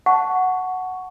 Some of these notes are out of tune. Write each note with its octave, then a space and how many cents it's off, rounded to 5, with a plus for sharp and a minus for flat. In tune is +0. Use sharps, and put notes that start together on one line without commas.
F#5 +0 A5 +0 C#6 +10